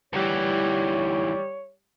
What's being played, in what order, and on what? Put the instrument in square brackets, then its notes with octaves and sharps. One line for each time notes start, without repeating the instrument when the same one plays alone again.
[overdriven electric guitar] D2 E3 [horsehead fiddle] G3 [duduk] C#5